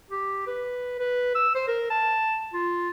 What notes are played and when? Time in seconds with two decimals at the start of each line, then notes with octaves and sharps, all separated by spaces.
0.11 G4
0.47 B4
0.99 B4
1.35 E6
1.55 C5
1.67 A#4
1.90 A5
2.53 F4